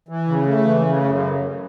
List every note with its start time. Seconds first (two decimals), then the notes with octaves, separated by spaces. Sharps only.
0.09 E3
0.28 C#3
0.46 A3
0.65 E3
0.85 C#3
1.04 F#2